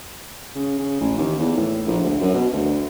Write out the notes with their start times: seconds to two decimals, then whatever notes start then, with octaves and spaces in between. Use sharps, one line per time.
0.56 C#3
0.79 C#3
1.01 A1
1.18 D#2
1.39 E2
1.57 A2
1.87 A#1
2.03 D2
2.21 F#2
2.34 B2
2.53 D2